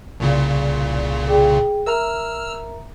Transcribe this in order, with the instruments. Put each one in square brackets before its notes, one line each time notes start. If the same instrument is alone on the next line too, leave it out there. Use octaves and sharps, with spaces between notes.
[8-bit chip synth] C2 A#2 C#3
[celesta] G#4 G5
[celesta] A#4 E5 A#5 [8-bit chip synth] E6 F6